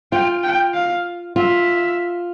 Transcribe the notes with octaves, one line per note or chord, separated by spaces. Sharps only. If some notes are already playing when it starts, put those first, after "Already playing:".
F4 G5
G5
F5
F4 E5